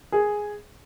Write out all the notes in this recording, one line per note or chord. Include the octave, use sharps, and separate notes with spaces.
G#4